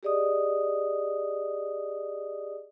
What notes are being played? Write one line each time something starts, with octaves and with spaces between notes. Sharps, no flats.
G4 G#4 D5 D#5 D#6